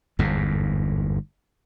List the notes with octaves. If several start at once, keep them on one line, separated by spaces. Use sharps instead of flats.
G1 E2 G#2